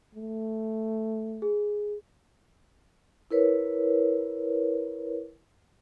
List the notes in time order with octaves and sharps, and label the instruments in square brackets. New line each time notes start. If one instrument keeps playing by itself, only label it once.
[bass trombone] A3
[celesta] G#4
[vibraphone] E4 A#4 B4 C#5